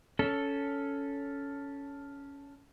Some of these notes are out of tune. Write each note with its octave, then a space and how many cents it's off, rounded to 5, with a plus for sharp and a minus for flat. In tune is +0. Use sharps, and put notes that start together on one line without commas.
C#4 +15 A4 +0